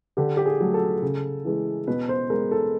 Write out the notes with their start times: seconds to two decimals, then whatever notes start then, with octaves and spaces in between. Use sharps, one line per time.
0.17 D3 G4
0.37 G4
0.46 G#4
0.60 F#3 A3
0.74 A4
1.02 C#3
1.45 E3 G#3
1.87 B2 B4
2.09 C5
2.30 G#3 A#4
2.51 A4